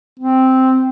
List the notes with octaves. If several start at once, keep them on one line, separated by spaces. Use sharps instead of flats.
C4